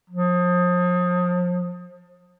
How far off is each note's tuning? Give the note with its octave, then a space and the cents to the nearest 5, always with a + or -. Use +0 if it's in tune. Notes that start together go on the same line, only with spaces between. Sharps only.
F3 +35